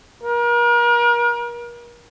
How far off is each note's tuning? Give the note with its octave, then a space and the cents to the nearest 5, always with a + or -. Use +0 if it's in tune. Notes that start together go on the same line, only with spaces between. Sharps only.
A#4 +40